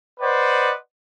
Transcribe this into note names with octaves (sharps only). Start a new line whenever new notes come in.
B4 C5 D5 D#5 F#5